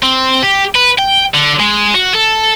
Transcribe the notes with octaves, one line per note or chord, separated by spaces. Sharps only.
C4
G4
B4
G5
D3
G#3
F#4
A4